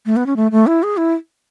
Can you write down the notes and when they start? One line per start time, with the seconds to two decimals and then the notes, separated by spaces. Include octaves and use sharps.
0.06 A3
0.16 B3
0.26 C#4
0.36 A3
0.51 A3
0.67 E4
0.83 G#4
0.97 E4